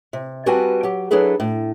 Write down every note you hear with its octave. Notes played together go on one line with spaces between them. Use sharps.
C3
G3 C4 F#4 B4 G#5 A5
F#3 G4
F#3 D4 E4 G#4 A4 B4
A2